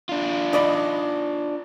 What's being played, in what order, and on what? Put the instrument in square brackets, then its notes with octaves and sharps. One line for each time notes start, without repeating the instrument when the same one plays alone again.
[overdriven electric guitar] D4 F4
[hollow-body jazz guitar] D#4 D5 B5